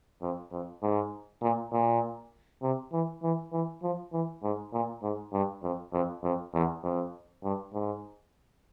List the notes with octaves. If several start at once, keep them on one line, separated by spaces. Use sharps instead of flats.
F2
F2
G#2
A#2
A#2
C3
E3
E3
E3
F3
E3
G#2
A#2
G#2
G2
F2
F2
F2
E2
F2
G2
G#2